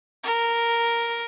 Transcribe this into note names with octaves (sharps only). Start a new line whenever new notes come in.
A#4